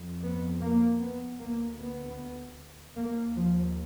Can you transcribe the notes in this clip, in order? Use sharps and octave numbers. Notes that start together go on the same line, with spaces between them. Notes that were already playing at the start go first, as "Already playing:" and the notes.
Already playing: F2
B3
A#3
B3
D2 A#3
B3
D#2 A#3
F3